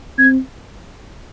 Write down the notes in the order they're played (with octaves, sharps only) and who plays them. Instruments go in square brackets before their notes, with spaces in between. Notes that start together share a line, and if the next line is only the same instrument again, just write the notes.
[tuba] C4 [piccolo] G#6